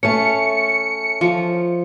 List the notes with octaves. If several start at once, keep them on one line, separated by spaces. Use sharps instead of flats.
A3 C#4 C#7
F3